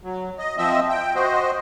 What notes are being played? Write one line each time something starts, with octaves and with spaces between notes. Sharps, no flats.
F#3
D#5
F3 C4 D#5 E5
G5
F#4 C5 D#5